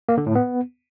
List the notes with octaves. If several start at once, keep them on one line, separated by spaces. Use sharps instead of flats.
A#3
D3
A2
B3